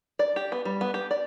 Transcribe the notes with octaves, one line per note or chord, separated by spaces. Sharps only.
D5
G4
B3
G3
B3
G4
D5